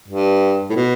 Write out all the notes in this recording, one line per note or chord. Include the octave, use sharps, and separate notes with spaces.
G2
A2
B2